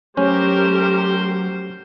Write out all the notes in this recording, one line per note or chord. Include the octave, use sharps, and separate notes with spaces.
F#3 A3 C#4 G4 A#4 C5